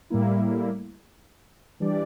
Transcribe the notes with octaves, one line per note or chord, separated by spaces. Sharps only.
A2 G3 A#3 E4
E3 G3 D4 G4 D5